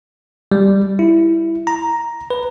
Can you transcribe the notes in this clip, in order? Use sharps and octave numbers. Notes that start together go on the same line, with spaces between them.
G3
E4
A#5
B4